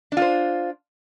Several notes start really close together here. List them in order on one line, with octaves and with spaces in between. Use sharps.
D4 F4 C5